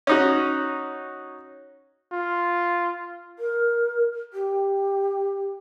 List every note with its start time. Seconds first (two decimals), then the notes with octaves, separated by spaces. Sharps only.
0.07 C#4 D#4 F#4
2.12 F4
3.37 A#4
4.33 G4